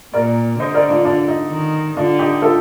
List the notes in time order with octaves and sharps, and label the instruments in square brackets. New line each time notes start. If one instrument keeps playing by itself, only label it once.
[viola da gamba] A#2 [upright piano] A#4 D5
[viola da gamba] D3 [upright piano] C5 D#5
[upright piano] A#4 D5
D4 F4
D4 F4
D#4
[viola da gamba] D#3
[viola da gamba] D3 [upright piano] D4 F4
[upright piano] D#4 G4
F4 A4